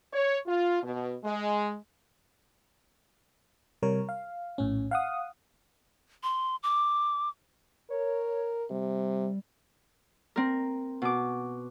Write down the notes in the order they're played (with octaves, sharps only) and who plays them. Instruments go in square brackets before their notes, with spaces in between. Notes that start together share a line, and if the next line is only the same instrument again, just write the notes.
[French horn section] C#5
F4
B2
G#3
[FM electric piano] C3 G3 A#4 C#5
F5
A#1 A2 C#4
F5 F#5 D#6
[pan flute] C6
D6
[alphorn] A#4 [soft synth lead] C#5
[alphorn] C3 [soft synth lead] G3
[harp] C4 A#4
B2 D6